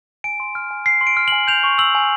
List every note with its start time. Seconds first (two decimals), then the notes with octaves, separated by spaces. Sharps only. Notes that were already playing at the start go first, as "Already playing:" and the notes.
0.24 G#5 D7
0.40 C6
0.55 F6
0.71 G#5
0.86 G#5 C7
1.01 C6
1.07 D7
1.17 F6
1.28 G#5 F#7
1.48 G6 F7
1.64 C#6
1.78 E6 F#7
1.95 G#5